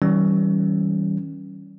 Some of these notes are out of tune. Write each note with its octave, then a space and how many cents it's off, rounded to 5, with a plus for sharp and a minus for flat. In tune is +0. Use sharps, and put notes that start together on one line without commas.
D#3 +45 G3 -30 C#4 +0